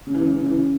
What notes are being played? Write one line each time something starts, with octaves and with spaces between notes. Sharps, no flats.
C#3
E3
C#3
E3
C#3
E3
C#3